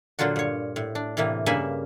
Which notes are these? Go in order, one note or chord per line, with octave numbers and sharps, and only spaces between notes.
A#2 D3 F#3 F4 F#4
G2 C#5
A2
D4
A2 C3 E3 A#3
G2 C#3 A#3 E5 G#5 B5